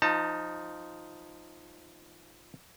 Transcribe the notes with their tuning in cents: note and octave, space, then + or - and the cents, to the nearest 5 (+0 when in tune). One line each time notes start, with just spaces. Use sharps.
F3 +0 D#4 +0 A5 +30